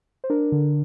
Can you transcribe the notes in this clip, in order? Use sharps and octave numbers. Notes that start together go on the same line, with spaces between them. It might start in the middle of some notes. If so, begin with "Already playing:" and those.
C5
D4 A#4
D3